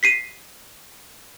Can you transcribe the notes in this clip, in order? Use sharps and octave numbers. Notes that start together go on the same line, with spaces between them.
B6 C7 D#7